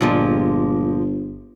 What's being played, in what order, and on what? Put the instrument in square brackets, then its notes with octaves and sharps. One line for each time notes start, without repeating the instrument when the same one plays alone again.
[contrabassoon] G1 [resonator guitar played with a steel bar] A#2 F3 G#3